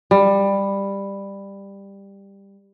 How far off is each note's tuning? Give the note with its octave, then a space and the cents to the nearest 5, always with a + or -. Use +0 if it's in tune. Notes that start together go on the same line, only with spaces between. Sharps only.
G3 +15